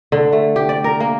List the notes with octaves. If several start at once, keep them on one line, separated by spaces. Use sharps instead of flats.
D3
A3
G4
D5
A#4
A#3